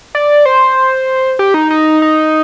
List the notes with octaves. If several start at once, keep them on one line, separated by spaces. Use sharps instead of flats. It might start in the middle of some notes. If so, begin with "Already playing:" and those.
D5
C5
G4
D#4
D#4
D#4